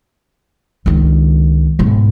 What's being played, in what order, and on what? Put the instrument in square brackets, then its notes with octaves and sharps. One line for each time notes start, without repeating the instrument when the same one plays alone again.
[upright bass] C#2 D#3
B1 G#2